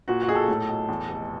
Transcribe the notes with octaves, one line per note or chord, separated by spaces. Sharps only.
A#2 F#4
F#4
B1 G#4
A4
A2
B1
E2
F1